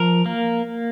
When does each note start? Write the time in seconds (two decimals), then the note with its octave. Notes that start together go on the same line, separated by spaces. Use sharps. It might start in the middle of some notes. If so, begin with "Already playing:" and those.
Already playing: F3 A#4
0.26 A#3